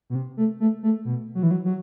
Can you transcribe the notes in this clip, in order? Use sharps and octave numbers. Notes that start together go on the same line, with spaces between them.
B2
C3
A3
A3
A3
B2
F#3
E3
F#3
F#3